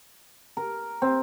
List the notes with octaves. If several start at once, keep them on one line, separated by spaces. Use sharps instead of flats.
A#4
C4